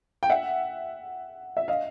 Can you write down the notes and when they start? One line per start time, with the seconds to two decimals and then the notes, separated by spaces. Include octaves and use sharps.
0.23 G5
0.30 E5 F#5
1.57 E5
1.68 D#5 F5